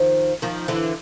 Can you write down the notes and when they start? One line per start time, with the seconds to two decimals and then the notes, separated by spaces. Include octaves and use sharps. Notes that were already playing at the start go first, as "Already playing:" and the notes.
Already playing: D#3 F3
0.42 D#3 F3
0.68 D3 E3